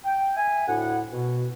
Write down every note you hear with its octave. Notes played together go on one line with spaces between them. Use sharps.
G5
E5 G#5
D2 A2 F#5
B2